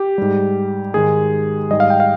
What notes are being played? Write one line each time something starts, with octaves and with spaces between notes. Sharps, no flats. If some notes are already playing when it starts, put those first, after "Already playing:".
Already playing: G4
G#2 G3
G#2 D#3 G#3 G#4
G#2 G3 D#5
F5
G5
F5